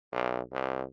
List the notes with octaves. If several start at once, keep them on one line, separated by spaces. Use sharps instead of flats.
B1
C2